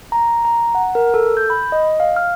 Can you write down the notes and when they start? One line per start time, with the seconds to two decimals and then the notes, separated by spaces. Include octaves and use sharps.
0.12 A#5
0.45 A#5
0.75 F#5
0.95 A#4
1.14 A4
1.37 G6
1.50 B5
1.72 D#5
2.00 F5
2.16 F6